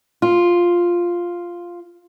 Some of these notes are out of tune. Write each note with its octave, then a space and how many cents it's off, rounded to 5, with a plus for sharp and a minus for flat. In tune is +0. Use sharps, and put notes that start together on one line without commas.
F4 +0